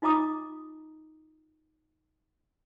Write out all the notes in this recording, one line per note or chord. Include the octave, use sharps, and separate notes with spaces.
D#4 F4 D#5 A#5 D6 D#6